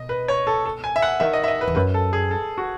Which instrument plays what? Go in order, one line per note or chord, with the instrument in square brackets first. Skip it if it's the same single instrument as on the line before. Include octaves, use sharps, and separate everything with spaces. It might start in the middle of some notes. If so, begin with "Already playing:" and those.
Already playing: [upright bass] B2 [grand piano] D#5
[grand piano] B4
C#5
A4
A4
G#5
E5
F#5
[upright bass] D#3 [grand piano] E5
[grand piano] D#5
E5
D#5
B4
[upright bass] E2
[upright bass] F#2 [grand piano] B4
[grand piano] A4
G#4
A4
F#4